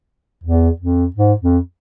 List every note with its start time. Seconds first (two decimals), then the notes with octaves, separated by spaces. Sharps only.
0.43 E2
0.80 F2
1.16 G#2
1.41 F2